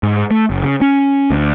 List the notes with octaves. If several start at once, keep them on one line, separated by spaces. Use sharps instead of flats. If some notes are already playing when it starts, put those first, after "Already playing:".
G#2
A3
F#1
C#3
C#4
D2